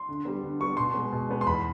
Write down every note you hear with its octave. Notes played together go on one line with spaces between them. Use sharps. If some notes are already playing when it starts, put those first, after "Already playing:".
Already playing: C6
D3
G3 B3
D3
G3 B3 C#6
B2 C6
G#3 B3
B2
G#3 B3
C6
E2 B5